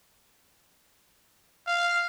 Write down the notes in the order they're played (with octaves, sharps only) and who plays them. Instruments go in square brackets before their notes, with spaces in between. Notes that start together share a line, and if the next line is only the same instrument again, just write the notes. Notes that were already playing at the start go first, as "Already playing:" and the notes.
[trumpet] F5